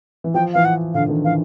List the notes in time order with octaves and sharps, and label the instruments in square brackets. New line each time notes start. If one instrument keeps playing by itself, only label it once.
[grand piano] E3
[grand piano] F3 [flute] G5
[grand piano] E3 [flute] F5
[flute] F#5
[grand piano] D3 [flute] F5
[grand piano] D3
D#3
[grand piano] E3 [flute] F5